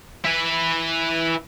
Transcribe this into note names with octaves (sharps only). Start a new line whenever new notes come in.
E4 B4